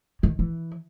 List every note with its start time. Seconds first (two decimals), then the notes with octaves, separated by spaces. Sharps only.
0.23 D#3
0.39 E3